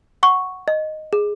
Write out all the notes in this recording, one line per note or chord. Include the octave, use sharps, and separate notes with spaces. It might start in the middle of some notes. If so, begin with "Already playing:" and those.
F#5 C#6
D#5
G#4